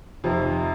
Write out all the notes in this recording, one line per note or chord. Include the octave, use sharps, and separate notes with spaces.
F2 C3 D#3